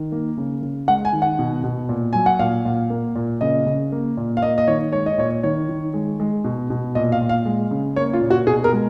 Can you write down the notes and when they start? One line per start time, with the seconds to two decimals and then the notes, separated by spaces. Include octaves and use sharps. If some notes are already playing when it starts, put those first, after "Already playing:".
Already playing: D#3
0.12 A#3
0.38 C#3
0.62 C#3
0.88 G#3 F#5
1.05 G#5
1.13 D#3
1.22 F#5
1.39 B2
1.64 B2
1.89 A#2
2.13 F#3 G#5
2.26 F#5
2.39 A#2 F5
2.65 A#2
2.90 A#3
3.15 A#2
3.41 C#3 D#5
3.66 C#3
3.92 A#3
4.17 A#2
4.37 F5
4.42 A#3 D#5
4.58 D#5
4.68 D#3 C#5
4.93 G#3 C#5
5.06 D#5
5.18 A#2 C#5
5.43 D#3 C#5
5.69 D#3
5.94 G#3
6.20 G#3
6.44 B2
6.70 B2
6.95 A#2 D#5
7.12 F5
7.21 A#2
7.29 F5
7.46 G#3
7.71 C#3
7.96 A#3 C#5
8.13 F4
8.21 A#2
8.30 F#4
8.47 B2 G#4
8.64 A#4
8.72 G#3